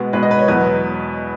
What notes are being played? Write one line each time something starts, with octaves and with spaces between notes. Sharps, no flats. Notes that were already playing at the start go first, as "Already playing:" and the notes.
Already playing: B2 G#3 B3
B2 G#3 B3 B4
D#5
B4
C#5
E2 B2 F#3 B3 B4